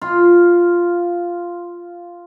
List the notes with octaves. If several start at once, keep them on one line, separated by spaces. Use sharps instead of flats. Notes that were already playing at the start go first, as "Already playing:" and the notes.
F4 C6